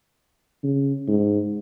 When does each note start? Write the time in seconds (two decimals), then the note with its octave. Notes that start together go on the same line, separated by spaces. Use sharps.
0.64 C#3
1.08 G#2